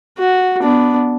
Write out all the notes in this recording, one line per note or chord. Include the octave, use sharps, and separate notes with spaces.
F#4
B3 D4